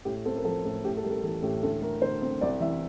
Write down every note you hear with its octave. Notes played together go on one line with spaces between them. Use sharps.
A2 G4
C4 A4
A#4
F3 A4
A2 A4
A2 G4
A4
G3 A#4
A4
E3 A4
A2 G4
D2 A4
A3 A#4
D3 C5
C4
C2 D5
E3 E5